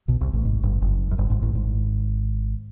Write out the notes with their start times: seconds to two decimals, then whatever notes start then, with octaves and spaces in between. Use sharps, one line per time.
0.08 B1 B2
0.21 C2 C3
0.33 A1 A2
0.45 G#1 G#2
0.63 G1 G2
0.81 F#1 F#2
1.11 F#2
1.18 G1 G2
1.30 G#1 G#2
1.42 A1 A2
1.55 G#1 G#2